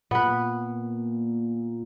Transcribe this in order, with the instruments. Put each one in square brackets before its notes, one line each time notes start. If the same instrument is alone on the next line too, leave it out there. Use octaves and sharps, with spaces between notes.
[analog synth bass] A#2 [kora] B3 B4